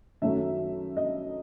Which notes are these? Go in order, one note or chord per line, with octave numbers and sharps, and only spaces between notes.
F#2 D#3 F#3 A3 E5
D#5